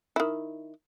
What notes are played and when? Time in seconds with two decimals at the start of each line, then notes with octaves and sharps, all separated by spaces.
0.16 D#3 E4